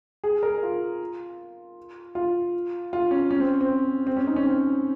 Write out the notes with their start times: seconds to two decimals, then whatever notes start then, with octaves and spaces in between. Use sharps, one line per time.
0.24 G#4
0.43 A#4
0.63 F4
2.15 F4
2.93 F4
3.11 C#4
3.31 C#4
3.40 C4
3.61 C4
4.07 C4
4.17 C#4
4.27 D#4
4.36 C#4
4.46 C4